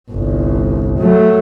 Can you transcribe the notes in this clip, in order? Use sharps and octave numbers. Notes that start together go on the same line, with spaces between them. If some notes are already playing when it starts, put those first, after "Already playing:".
G1 C2
F#3 A3